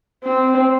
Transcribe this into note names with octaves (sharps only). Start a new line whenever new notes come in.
C4